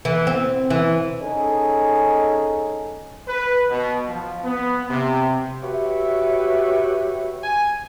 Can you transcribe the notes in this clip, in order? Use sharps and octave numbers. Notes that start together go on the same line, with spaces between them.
E3
C4
E3
C#4 D#4 G#4 A4
B4
B2
F3
B3
C3
F#4 G4 B4 C#5 E5
G#5